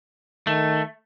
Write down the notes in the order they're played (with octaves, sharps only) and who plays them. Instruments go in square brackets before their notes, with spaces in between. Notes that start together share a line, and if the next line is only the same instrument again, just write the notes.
[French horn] D#3 [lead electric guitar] A3